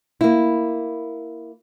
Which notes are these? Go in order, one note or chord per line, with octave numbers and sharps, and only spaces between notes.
A#3 E4